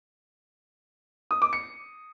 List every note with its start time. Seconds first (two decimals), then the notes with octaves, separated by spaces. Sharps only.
1.31 D#6
1.42 D6
1.53 C#7